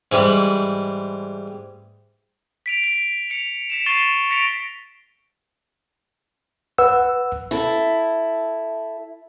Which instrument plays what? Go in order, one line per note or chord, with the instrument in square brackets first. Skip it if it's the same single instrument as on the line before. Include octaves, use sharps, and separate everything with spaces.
[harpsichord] G#2 E3 G3 B5
[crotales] B6 D7 F7
B6
C#7 F7
B6 C#7 E7
C#6 A6 C7 D#7 E7 G7
A#6 B6 C#7 D7 F7
[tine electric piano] B4 F#5 E6
[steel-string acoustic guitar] E4 A4